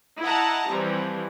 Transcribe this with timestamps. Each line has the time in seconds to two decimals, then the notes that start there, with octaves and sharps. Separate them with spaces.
0.21 E4 D#5 F#5 A5 A#5
0.70 E3 F3 G3 C4